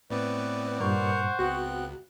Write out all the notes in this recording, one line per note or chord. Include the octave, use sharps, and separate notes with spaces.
A2 B3 C4 B4 D5
G2 A#2 A#4 C5 F#5 C#6
C#2 B3 C4 F#4 F#6